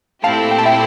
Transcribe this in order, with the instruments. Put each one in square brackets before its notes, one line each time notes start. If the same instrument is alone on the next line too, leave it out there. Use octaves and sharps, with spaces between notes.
[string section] A#2 A3 C4 E4 G4 [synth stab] F5 A5
[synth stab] G5
A5
E5 G5